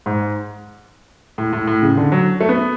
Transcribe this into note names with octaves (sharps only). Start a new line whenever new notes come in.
G#2
A2
A2
A2
C#3
D3
F#3
A3
B3